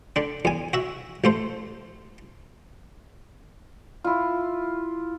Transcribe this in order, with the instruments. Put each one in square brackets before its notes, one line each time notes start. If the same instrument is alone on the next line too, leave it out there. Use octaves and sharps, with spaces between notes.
[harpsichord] D3 D4
E2 G#5
F#4 E5
A1 A3 C5
[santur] E4 F4